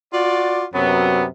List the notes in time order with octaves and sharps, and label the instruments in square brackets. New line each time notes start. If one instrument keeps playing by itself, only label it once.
[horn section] F4 F#4 D5
F#2 C3 F#3 B3